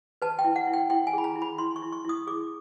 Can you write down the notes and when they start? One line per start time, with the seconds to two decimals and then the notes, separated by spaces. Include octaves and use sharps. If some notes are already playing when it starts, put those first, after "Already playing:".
0.22 B4 A5
0.39 G5
0.44 E4
0.56 F#5
0.67 E4
0.73 G5
0.90 E4 G5
1.07 G#5
1.13 G#4 B5
1.24 A#5
1.36 E4
1.42 B5
1.58 E4 C6
1.76 C#6
1.82 E4
1.92 C#6
2.05 E4 D#6
2.27 G#4 D6